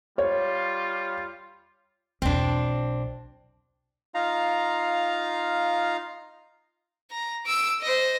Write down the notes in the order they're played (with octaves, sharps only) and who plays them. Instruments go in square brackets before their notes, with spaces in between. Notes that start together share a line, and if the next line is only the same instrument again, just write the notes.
[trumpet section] G3 F4 [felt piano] C#5
[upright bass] B1 E2 [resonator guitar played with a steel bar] C4 D4
[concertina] D#4 F4 F5 A#5
[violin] A#5
E6 D7
C5 D#5